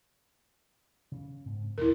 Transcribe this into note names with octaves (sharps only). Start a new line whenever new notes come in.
C#3
G#2 C4
D#2 A#2 D3 E4 A#4